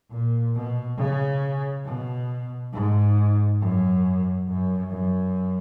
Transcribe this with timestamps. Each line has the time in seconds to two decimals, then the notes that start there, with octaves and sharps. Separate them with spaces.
0.11 A#2
0.55 B2
0.98 C#3
1.85 B2
2.73 G#2
3.61 F#2
4.48 F#2
4.91 F#2